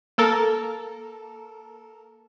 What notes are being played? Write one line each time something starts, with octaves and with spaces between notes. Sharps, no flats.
A#3 A4 A#4